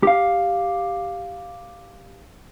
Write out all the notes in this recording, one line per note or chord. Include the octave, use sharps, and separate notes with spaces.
G4 F5